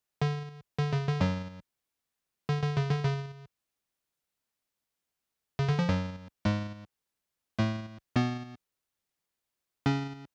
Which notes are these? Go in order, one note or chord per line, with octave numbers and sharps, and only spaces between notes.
D3
D3
C#3
D3
F#2 F#3
D3
D3
C#3
D3
C#3
C#3
D3
F3
F#2 F#3
G#2 G#3
A2 A3
B2 B3
C#3 C#4